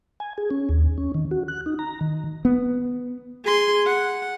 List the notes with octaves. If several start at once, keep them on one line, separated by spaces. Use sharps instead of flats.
G#5
G#4
C#4
D#2
C#4
D#3
F#4
F#6
D#4
A#5
D#3
B3
G#4 C6
F#5